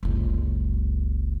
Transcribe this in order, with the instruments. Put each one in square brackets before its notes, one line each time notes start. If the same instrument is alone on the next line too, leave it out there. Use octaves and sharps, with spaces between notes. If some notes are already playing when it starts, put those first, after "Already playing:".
[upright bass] F#1 C#2